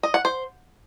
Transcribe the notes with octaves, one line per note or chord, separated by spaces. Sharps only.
D#5
F#5
C5